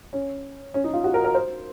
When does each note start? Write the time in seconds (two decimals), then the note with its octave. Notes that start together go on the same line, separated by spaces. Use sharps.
0.13 C#4
0.74 C#4
0.84 D#4
0.94 F4
1.04 F#4
1.14 A#4
1.24 A#4
1.35 C5